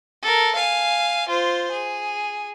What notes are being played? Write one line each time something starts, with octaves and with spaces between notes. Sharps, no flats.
A4 A#4
F5 G#5
F4 C5
G#4